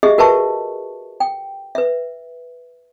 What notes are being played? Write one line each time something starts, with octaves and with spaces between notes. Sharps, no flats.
G4 G#4 D#5 E5
F#4 A#4 B4 E5 A5 C#6
G5
B4 E5